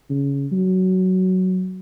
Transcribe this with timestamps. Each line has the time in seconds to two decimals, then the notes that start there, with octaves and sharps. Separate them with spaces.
0.10 C#3
0.52 F#3